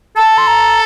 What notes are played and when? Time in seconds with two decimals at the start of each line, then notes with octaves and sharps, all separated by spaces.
0.16 A4 A5
0.38 C6
0.47 A#5